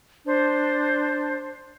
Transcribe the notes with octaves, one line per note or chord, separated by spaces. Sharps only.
D4 C5